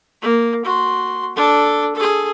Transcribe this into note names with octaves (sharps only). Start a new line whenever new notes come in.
A#3
F#4 C6
D4 A4
G#4 A4